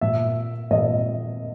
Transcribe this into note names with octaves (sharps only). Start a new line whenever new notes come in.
A#2 E5
A#2 D#5